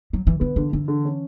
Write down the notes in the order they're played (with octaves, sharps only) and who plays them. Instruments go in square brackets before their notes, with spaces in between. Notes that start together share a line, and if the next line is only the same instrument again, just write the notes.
[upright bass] F#3
E3
[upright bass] D3 [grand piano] B3
[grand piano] D3 [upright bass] E3
[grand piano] D3 [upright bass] E3
[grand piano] D3
C#4